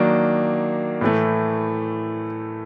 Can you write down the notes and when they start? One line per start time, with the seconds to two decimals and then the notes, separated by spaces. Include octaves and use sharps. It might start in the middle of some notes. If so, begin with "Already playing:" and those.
Already playing: D#3 F#3 A#3 D4
1.01 A2 E3 A3